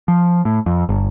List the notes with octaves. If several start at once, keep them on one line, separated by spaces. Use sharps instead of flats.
F3
A2
F2
G1